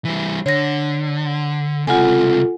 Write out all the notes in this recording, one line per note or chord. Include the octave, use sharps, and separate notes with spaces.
E3 G3
D3 C#5 A#6
C#2 C3 F4 A4 F#5 G#5